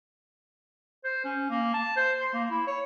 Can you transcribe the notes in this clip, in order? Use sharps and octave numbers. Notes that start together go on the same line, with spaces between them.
C5
C#4
A#3
A5
C5
C6
A#3
E4
C#5